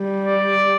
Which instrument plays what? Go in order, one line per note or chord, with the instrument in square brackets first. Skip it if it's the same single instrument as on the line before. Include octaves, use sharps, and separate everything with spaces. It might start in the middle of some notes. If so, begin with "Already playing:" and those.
Already playing: [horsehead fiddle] G3
[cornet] D5